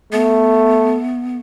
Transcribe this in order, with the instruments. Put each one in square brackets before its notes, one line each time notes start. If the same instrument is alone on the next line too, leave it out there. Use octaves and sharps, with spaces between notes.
[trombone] A3 [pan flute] B3